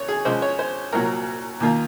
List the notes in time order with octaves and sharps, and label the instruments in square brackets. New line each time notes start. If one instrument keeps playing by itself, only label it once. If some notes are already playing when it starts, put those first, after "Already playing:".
Already playing: [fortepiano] C2 C#5
G#4
C#2 C#3 F3 G#3 C5
C#5
C5
C2 A#2 F#3 A#4
D#2 D#3 A#3 F4